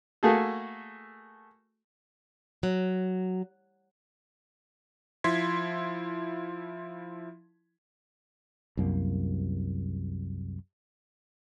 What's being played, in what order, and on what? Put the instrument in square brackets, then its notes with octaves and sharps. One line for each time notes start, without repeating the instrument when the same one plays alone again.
[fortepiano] A3 A#3 F#4 G#4 A4
[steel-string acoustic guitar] F#3
[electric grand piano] F3 E4 C6 G#6 B6
[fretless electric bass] C2 F#2 A#3